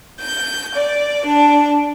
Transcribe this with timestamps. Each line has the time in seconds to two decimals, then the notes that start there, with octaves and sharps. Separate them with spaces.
0.21 G6
0.76 D5
1.25 D4